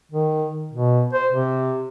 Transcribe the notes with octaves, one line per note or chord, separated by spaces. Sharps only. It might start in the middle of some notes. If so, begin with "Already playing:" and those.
D#3
B2
C5
C3